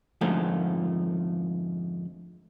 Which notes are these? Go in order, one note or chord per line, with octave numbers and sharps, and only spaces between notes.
F2 G#2 D3 F3 A3